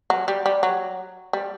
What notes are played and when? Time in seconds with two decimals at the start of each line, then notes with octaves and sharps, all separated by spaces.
0.10 F#3
0.28 G3
0.46 G3
0.63 F#3
1.33 G3